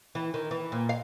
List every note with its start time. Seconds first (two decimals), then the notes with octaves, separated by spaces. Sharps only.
0.15 E3
0.34 D#3
0.51 E3
0.72 A#2
0.89 F5